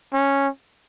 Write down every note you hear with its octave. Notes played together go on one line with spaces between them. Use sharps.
C#4